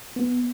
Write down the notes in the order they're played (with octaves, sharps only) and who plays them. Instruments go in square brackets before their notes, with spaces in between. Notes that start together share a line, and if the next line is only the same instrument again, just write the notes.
[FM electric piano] B3